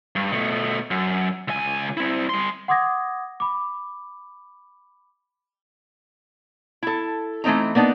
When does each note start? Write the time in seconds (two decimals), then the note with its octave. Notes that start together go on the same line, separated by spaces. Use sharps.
0.16 G2
0.32 B2 A3
0.91 F#2
1.48 C#2 G#5
1.97 C4 E4
2.29 G3 C6
2.68 F#5 C6 D6 D#6 G#6 A#6
3.40 B5 D6
6.83 E4 A4
7.44 E3 A3 C4 D#4 A#5
7.75 A#3 B3 D4 D#4